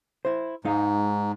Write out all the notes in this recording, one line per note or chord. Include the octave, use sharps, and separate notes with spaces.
E4 C5
G#2 G#3 D#4 F5